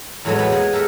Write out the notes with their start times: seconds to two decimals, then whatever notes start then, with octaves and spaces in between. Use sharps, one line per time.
0.25 E2 A2 E3 F#3 G#3 B3
0.39 B3 B4 G5
0.52 G#3 A#3 B3 G#4 G#5
0.73 G4 A4 A#4 E5 F#5